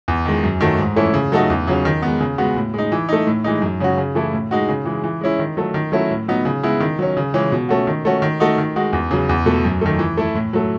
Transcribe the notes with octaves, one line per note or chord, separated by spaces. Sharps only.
E2
D#3 G#3
F#2
D#3 F#3 A3
G#2
E3 A3 C#4 E4
C#3
F#3 A3 D#4 F#4
E2
C#3 F#3 C#4
D#3
G#3 B3
C#3
G#3 B3 F#4
A2
G#3 D#4
E3
A3 D#4
A2
E3 G#3 D#4
F#2
C#3 G#3 C#4 F#4
C#3
E3 A3 E4
A2
G#3 D#4 F#4
C#3
E3 G#3
E3
G#3 C#4 E4
D#3
F#3 A3
D#3
F#3 A3 C#4 E4
A2
F#3 B3 D#4
C#3
G#3 B3 E4
D#3
F#3 C#4
C#3
E3 G#3 C#4
B2
A3 C#4 F#4
D#3
A3 C#4 F#4
D#3
A3 D#4 F#4
D#3
G#3 D#4 F#4
E2
C#3 F#3
E2
B2 A3
F#2
D#3 A3
E3
A3 E4
A2
F#3 A3